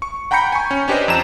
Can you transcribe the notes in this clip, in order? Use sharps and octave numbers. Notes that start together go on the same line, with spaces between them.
C#6
F#5 G5 A#5 B5 G6 C#7
G#5 C#6
C#4
C#4 D4 G4 B4 C5 D#5
F2 A#5 E7